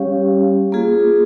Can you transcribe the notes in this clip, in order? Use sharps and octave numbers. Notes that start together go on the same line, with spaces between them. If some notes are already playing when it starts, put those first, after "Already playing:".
Already playing: G3 C#4 G4 C#5 F5
A#3 F4 G#4